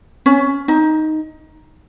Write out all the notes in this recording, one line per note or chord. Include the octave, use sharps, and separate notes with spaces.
C#4
D#4